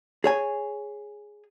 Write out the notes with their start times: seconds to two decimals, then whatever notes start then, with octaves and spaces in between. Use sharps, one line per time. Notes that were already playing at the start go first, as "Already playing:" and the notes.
0.24 G#4 C#5 G#5